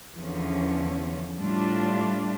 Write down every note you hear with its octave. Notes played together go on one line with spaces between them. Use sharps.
E2 D3 F3 C#4
A2 G3 D4 F4